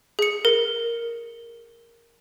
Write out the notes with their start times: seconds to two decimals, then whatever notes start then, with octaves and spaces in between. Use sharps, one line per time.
0.19 G#4 C#7
0.45 A#4